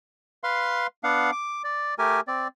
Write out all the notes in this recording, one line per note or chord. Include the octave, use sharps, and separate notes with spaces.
B4 F5 C6
B3 D4 F5 F#5
D6
D5
A3 G4 A#4 G#5
C4 D5